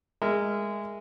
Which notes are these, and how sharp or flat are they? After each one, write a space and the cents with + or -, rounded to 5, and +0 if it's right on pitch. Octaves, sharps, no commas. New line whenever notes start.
G#3 -15 A#4 -10 E5 +0